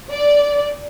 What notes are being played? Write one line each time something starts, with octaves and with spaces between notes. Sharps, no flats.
D5